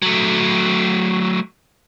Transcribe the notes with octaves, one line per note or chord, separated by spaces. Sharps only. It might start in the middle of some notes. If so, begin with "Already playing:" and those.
F#3 A3